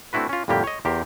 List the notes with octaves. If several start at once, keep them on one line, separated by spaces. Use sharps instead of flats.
A3 C4 D4 E4 F#4 B4
C#4 F4
F2 A2 D3 G3 A#3 G4
C#5 D#5
E2 G4 A#4 C5